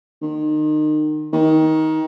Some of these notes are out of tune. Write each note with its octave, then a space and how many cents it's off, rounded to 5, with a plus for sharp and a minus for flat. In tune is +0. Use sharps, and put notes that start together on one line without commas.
D#3 -30
D#3 +20